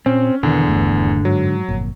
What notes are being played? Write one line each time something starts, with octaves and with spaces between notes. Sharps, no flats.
A#2 C4 C#4
E2 B2 D3 D#3
D#1 G2 A3
G#2 F#3
G1 F2 A#2